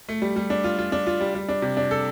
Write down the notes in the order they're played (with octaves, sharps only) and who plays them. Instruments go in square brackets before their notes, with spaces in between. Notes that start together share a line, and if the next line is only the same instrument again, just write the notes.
[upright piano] A3
G3
G3
D4
F4
F4
D4
F4
G3
G3
D4
C3
D4
A4